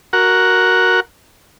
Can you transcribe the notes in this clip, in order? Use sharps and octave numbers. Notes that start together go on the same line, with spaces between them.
F#4 A#4 F#5